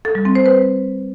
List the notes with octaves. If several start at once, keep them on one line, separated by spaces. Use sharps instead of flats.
A4
G3
C4
C5
B4